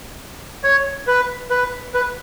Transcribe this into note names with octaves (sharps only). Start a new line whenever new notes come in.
C#5
B4
B4
B4